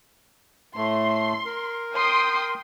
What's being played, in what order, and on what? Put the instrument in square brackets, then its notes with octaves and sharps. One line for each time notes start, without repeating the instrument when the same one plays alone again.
[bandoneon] A2 A3 [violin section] C6
[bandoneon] A#4
[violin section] G5 C6 D#6